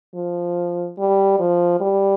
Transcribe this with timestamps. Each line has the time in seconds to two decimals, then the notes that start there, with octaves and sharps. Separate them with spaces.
0.15 F3
0.98 G3
1.39 F3
1.80 G3